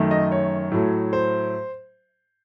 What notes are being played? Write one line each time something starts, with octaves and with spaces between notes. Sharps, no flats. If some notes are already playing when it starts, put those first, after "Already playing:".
Already playing: F#2 D#3 A3
D#5
C#5
A2 F#3 A3
C5